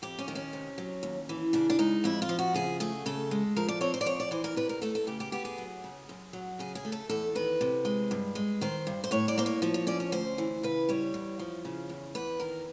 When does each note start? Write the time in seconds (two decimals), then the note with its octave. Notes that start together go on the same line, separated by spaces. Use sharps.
0.02 F2 G4
0.19 C#4
0.28 D#3
0.35 C#4
0.53 C3
0.78 F#3
1.03 D#2
1.29 E3
1.53 C#3 D4
1.70 D4
1.79 G#3 D#4
2.04 F2 E4
2.22 F4
2.29 F3
2.39 F#4
2.54 C#3 G#4
2.80 A3 G#4
3.06 C#3 A4
3.31 G#3
3.56 F3 A#4
3.68 D5
3.81 C4 C#5
3.94 C5
4.01 D5
4.06 F2 C#5
4.20 D5
4.31 E3 C5
4.44 A#4
4.56 C3 B4
4.69 A#4
4.82 A3 A4
4.95 A4
5.07 C#3 G4
5.20 G4
5.32 B3 G4
5.45 G#4
5.58 F#3
5.84 C#3
6.09 F#2
6.33 F#3
6.59 C#3 G#4
6.75 G#4
6.85 A3
6.92 A4
7.09 E2 A4
7.35 D#3 B4
7.61 C3
7.85 G#3
8.11 G2
8.35 G#3
8.61 D#3 C5
8.87 G2
9.04 C5
9.11 A2 C#5
9.28 D5
9.38 A#3 C5
9.46 C#5
9.62 F3 C#5
9.74 C#5
9.87 C#4 D5
10.00 C#5
10.12 D2 C5
10.38 E3
10.63 C#3 B4
10.89 G3 C#5
11.14 E2
11.39 F3
11.65 C#3
11.89 E2
12.15 E2 B4
12.40 D#3 A#4